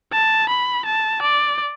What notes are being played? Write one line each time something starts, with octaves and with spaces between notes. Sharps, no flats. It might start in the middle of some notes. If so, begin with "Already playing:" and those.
A5
B5
A5
D5